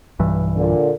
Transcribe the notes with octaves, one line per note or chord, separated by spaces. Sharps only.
B1 G2 E3
A#2 D3